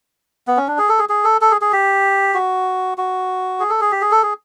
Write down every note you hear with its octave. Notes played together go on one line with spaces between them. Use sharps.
B3
C#4
D4
G#4
A4
G#4
G#4
A4
A4
G#4
G#4
G4
F#4
F#4
G#4
A4
G#4
G4
G#4
A4
G#4